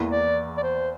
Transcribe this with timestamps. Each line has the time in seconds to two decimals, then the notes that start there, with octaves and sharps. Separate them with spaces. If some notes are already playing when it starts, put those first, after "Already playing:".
Already playing: E2 E3 A#3
0.11 D5
0.57 D5
0.63 C5